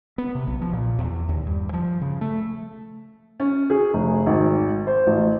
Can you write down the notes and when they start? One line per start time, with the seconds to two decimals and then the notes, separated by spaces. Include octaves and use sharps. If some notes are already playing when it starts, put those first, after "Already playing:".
0.18 B3
0.35 C3
0.47 B1
0.61 F3
0.73 A#2
0.99 E2
1.29 D#2
1.47 G2
1.73 F3
2.01 C#3
2.21 A3
3.40 C#4
3.70 G#4
3.93 F1
4.26 G#1
4.87 C5
5.07 A1